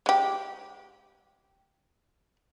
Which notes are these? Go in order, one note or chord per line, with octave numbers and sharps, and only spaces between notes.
G#3 G4